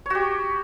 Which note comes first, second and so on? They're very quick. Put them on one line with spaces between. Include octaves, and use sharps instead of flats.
C#5 F#4 G4